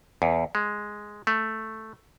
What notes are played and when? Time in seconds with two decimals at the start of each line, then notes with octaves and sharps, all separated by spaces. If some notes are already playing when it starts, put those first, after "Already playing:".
0.22 E2
0.55 G#3
1.27 A3